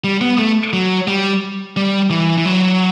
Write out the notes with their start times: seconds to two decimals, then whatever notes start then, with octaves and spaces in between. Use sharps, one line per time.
0.04 G3
0.21 B3
0.39 A3
0.73 F#3
1.08 G3
1.77 G3
2.11 E3
2.38 E3
2.46 F#3